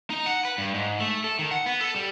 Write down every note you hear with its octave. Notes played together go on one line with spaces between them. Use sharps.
D#4
F#5
B4
G2
G#2
A3
A4
D#3
F#5
B3
A4
G3